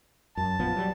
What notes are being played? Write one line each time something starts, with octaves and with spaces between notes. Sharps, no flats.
F#2 A5
A#1 F3 B3
F#3 G3